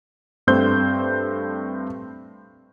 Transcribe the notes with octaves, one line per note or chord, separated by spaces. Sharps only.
G2 A3 C4 C5 G6